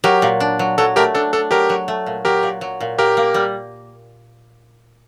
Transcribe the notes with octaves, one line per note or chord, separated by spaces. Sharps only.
F#3 G4 A#4
A#2
D4
F#3
F#3 A4
A3 G4 A#4
D4 A4
D4 A4
F#3 G4 A#4
F#3
A3
A#2
F#3 G4 A#4
A#2
F#3
A#2
A#3 G4 A#4
A#3
G3